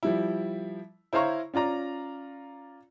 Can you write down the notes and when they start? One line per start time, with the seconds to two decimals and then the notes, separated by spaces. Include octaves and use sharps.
0.03 F3 G3 E4
1.13 E4 C5 C#5 F5 A#5 C#6
1.54 C#4 F4 D5 A#5